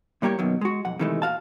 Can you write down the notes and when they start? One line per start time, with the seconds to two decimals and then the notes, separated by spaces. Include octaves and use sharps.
0.22 A2 G3 A#3 G4 C#5
0.39 F#2 B2 D#3 F#3
0.61 G#3 F#4
0.85 B1 F2 F#5
0.99 C3 D#3 E3 G#3 A3
1.22 A#2 F#4 F5 A5